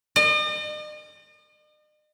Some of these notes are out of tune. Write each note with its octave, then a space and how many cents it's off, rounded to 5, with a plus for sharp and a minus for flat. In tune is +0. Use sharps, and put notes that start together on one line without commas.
D#5 -45